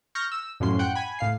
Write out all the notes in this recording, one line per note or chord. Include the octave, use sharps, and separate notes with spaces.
C#6 F6 G6 A#6
E6
F#2 A2 F3 F#3 C#4 C6
F#5 G5
G#5 B5
A2 F5 C7